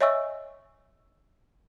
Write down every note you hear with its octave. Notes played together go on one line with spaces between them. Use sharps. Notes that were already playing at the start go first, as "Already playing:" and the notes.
C#5 D#5 E5 G#5 C#6 E6